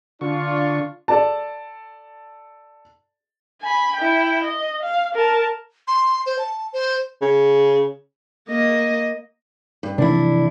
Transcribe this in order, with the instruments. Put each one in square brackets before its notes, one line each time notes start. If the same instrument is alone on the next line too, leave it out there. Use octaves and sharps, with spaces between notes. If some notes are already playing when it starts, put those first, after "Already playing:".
[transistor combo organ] D3 C#6 [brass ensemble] D4 F4
[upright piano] A4 D5 A5
[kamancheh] G#5 B5
E4 G5
D#5
F5
A#4 A5
[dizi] C6
C5
A5
C5
[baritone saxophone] C#3
[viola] A#3 D#5
[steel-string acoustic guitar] G2
[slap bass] C3 E3 F3 [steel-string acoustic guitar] D4 E4